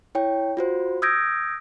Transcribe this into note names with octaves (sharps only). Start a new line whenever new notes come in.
E4 C#5 G5
F4 F#4 C5
D#6 E6 G6 G#6 A#6 D7